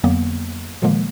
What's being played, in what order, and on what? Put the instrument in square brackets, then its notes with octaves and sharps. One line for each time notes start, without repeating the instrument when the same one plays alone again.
[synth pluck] F2 D3 F#3 A#3 B3
A#2 D3 D#3 F3 G#3 A#3